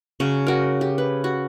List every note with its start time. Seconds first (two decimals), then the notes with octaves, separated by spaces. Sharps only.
0.20 C#3 F#3 C#4
0.47 F#4 A#4
0.81 G4
0.98 B4
1.24 F#4